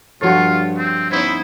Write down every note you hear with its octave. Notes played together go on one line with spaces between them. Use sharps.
G2 F3 F4 F#4 A4 C#5
C4
B3 C#4 D#4 E4 C5 C#5